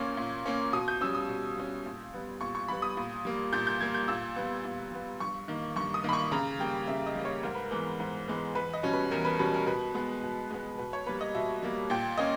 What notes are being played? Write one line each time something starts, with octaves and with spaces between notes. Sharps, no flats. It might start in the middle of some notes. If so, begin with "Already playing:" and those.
Already playing: A#2 A#3 C#4 C#6
A#2
A#3 C#4
B2 D#6
G6
G3 C#4 E6
D#6
B2
G3 C#4
A#2
G3 B3
A#2 C#6
C#6
G3 B3 B5
D#6
A#2
G3 A#3
A#2 G6
G6
G3 A#3 G#6
G6
A#2 E6
G3 B3
A#2
G3 B3
G2 C#6
D#3 A#3
G2 C#6
D#6
D#3 A#3 B5
C#6
C#3 A#5
G3 A#3 G5
C#3 E5
D#5
G3 A#3
C#5
G#2 A#4
B4
A#4
E3 G#3 B3
G#2
E3 G#3 B3
E2 B4
D#5
B2 G3 C#4
B4
E2 A#4
B4
B2 G3 C#4 B4
A#4
B2 B4
G#3 B3
B2
G#3 B3
B2 B4
C#5
G3 A#3 B4
D#5
B2 E5
G3 A#3
A#2 G5
A#3 C#4 D#5